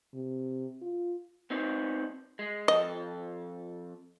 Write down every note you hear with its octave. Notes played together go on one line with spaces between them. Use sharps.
C3
F4
B3 C4 D#4
G#3
F2 A4 D#5